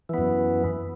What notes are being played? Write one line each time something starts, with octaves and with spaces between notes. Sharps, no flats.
F#2 E3 B3